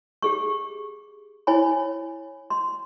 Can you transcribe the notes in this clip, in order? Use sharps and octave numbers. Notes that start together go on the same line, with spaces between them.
G4 G#4 C#6
E4 C#5 G#5 B5
C6